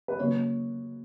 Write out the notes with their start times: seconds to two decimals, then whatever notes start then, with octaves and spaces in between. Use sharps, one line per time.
0.08 B4
0.19 C#3 F#3 A#3 C#5